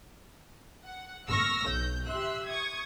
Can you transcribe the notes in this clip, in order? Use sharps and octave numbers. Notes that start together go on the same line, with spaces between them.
F#5
C#6 E6 F6 A#6
B1 G6
G4 E5 C6 E6 F#6
C#6 D#6 G#6